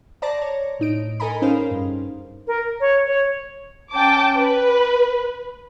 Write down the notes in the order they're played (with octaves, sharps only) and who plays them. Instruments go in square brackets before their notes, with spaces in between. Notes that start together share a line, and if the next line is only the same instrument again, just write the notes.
[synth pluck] C5 D5 A5 A#5 D6 A#6
C#5
A2 D#4 D7
A4 A#4 D#5 G#5 A#5 B5
C#4 D#4 G#4 A#4 C5 F5
G2
[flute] A#4
C#5
C#5
[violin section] C#4 G5 A5 D6
B4